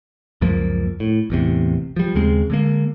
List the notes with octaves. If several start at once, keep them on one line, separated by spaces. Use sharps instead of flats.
C#2 F#2 F3 A#3
A2
A1 E2 C3
F3 G3
D#2 C#3 G#3 C4
D3 G#3 A#3